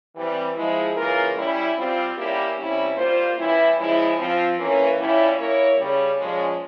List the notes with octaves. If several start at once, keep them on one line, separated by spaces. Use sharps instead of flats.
E3 G3 C4
F3 G#3 E4
C#3 E3 A#3 F4 A#4
G3 C#4 E4
G3 C4 F4
G3 A#3 C#4 E4 G4
C3 G3 C#4 E4
G3 A#3 F4 C5
E3 G3 C#4 E4
C#3 F3 G#3 E4
F3 C4 F4
E3 A#3 C#4
A#2 G3 C#4 E4
A#3 E4 A#4 C#5
C#3 G3 C#4
A#2 F3 G#3 C#4